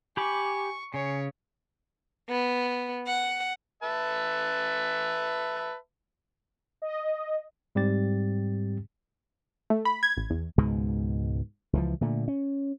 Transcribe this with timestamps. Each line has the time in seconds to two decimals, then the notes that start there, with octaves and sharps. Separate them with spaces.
0.17 G4 G#5 B5 C#6 D6
0.94 C#3 C#5 G#5
2.29 B3
3.07 F#5
3.83 B4 E5 A5
6.82 D#5
7.75 G#2 G3 C4 G4 A6
9.70 A3
9.85 B5
10.03 G#6
10.17 A1
10.30 E2
10.58 C#2 G#2 B2 G#3
11.73 C#2 E3 F3
12.01 A#2 D3 A3
12.28 C#4